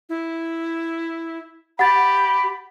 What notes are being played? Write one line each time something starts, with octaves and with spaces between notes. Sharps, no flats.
E4
G4 F#5 B5 A6